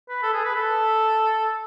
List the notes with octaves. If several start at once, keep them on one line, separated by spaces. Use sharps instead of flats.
B4
A4
G#4
B4
A4